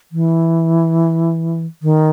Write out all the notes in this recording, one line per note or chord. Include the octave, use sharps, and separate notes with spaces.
E3
D#3